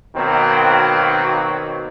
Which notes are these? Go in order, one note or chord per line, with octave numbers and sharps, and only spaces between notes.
B2 D#3 F#3 A#3 C4